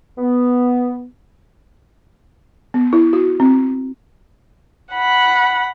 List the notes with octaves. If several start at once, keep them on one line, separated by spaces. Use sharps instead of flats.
B3
B3
E4
F#4
C4
F#5 B5